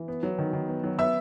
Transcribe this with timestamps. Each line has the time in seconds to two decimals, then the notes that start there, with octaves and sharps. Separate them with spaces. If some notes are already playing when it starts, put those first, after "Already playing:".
Already playing: E3
0.08 B3
0.23 F#3
0.39 D#3
0.53 D#3
0.69 B3
0.84 F#3
0.99 B3 E5 E6